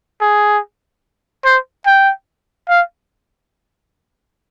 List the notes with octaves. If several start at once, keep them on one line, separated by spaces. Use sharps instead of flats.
G#4
C5
G5
F5